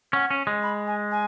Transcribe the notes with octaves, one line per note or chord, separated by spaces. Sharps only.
C#4 F#5
C#4
G#3
B5
G#5
G#5